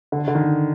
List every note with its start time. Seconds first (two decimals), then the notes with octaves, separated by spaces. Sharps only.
0.12 D3
0.28 D3
0.35 D#3